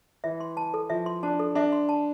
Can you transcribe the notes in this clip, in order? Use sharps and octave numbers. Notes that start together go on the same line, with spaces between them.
E3 E5
C6
A5
A4
F3 E5
C6
D4 A5
A4
D4 E5
C6
A5